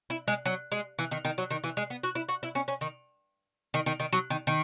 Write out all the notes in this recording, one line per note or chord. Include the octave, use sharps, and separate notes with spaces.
E4
G#3
F#3
G#3
E3
D#3
D#3
F#3
D#3
E3
G#3
B3
F#4
E4
F#4
E4
C#4
C#4
D#3
D#3
D#3
D#3
F#3
D#3
D#3